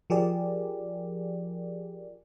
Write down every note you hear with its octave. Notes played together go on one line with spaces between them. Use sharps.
F3 G4 G#4 A#4 D5